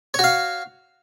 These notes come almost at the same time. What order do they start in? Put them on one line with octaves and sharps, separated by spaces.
C#5 F#4 F5